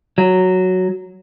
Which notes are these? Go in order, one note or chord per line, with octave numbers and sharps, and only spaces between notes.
F#3